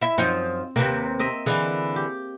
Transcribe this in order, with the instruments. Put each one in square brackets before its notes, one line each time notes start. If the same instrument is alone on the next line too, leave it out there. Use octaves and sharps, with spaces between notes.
[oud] E4 E5
[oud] F#2 F3 D#4 [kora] C4
[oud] D#2 C3 [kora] A#3 B4
[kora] C4 D#5 E5
[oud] D3 E3 [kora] G#4
[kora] G4